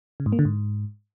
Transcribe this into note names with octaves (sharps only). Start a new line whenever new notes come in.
C#3
G#2
A#3
D3
G#2